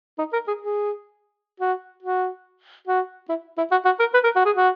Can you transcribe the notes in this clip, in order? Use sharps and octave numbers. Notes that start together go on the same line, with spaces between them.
D#4
A#4
G#4
G#4
F#4
F#4
F#4
E4
E4
F#4
F#4
A#4
B4
A#4
F#4
G#4
F#4